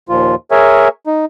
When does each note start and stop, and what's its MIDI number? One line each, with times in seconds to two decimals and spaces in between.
0.09 0.35 39
0.09 0.35 46
0.09 0.35 53
0.09 0.35 65
0.51 0.88 68
0.51 0.88 70
0.51 0.88 73
0.51 0.88 76
0.51 0.88 80
1.07 1.25 63